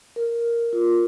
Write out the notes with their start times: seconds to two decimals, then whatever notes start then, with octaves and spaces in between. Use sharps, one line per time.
0.16 A#4
0.73 F4